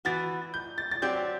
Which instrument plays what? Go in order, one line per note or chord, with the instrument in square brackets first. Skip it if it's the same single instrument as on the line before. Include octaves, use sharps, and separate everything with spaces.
[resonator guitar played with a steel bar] E3 B3 F#4 [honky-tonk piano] A6
[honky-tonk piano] G6
A6
A6
[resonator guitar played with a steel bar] F#3 C4 G4 D5 [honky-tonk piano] G6